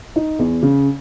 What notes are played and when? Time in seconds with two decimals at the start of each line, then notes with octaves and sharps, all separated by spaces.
0.16 D#4
0.39 E2
0.62 C#3